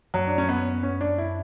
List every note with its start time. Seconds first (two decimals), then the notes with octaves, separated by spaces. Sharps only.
0.14 F#2 F#3
0.27 D4
0.38 C#4
0.49 B3
0.83 C#4
1.01 D4
1.18 E4